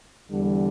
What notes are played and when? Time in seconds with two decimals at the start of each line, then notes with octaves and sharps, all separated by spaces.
0.29 E2 D3 G3